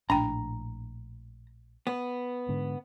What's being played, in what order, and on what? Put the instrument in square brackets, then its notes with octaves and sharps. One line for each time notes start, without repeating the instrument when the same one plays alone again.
[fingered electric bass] A#1 A2 [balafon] D4 G5 [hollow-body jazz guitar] A#5
[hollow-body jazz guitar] B3
[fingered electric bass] G#2 D3